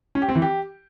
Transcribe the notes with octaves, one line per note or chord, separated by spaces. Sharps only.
C#4
G4
C4
E3
G4